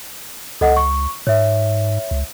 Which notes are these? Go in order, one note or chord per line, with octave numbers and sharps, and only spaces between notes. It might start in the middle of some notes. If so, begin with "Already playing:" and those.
C#2 A4 D#5 F#5
C#6
G#2 C#5 E5
C#2